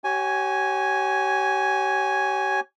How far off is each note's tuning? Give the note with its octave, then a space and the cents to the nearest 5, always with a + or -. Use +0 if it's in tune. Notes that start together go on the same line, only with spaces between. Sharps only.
G4 -40 C#5 +0 G#5 +0